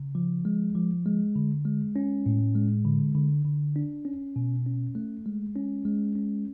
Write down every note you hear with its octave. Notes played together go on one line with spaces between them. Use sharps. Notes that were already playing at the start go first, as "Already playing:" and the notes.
Already playing: C#3
F3
G#3
F3
G#3
D3
G#3
C#4
A2
G#3
D3
D3
D3
D4
C#4
B2
C#4
A3
G#3
C#4
G#3
C#4